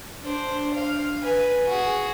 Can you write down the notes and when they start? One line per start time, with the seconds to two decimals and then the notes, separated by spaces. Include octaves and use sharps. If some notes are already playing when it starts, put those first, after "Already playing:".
0.21 D4 C5
0.74 F5
1.21 B4 G#5
1.67 F#4 G#4